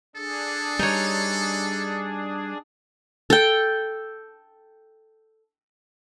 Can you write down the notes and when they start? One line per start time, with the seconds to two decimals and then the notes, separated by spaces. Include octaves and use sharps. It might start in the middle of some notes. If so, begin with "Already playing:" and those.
0.16 D4 G#4 A4
0.79 G3 D#4 C#5
3.30 A4 G5